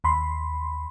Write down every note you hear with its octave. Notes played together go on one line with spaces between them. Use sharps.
D#2 B5 C6